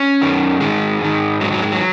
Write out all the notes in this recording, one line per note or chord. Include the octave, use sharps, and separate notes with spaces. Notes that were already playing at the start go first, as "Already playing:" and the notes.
Already playing: C#4
F#2 D#3
G#2 D#3 G#3
G#2 D#3
G#2 D#3 F#3
F#3
G#3
F#3